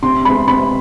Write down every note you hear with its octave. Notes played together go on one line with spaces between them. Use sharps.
C3 C6
G#3 B3 B5
C3 B5